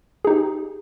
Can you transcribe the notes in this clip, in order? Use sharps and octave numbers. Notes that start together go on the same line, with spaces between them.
D#4 G4 G#4